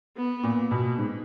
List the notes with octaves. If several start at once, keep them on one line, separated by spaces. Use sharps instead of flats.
B3
A#2
B2
G#2